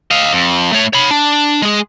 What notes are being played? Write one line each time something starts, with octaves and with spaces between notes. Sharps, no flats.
D#5 F5
F2
A3 C#5
C#5 B5
D4
G#3 G#4